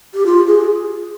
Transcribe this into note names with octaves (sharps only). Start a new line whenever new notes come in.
G4
F4
G#4